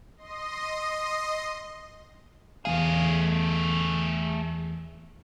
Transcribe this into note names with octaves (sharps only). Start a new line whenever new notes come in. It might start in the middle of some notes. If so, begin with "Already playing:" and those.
D#5 C6
E2 G#3 A3 G#4 F5